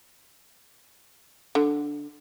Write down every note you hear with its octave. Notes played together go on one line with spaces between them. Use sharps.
D3